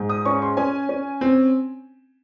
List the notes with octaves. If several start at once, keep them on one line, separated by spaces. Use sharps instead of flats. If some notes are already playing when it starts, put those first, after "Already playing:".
Already playing: G#2
D#6
C#4 C#6
C6
C#4 G#5
C#4
C4